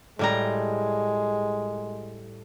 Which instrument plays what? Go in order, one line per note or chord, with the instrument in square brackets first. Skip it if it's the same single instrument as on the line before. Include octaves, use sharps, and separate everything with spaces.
[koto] A2 G3 A#5 [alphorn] G#3